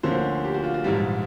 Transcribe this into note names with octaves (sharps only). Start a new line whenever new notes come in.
D2 D3 F3 A#3 C#4 C5
G4
F#4
F4
F#4
A#1 G#2 E3 G3 F4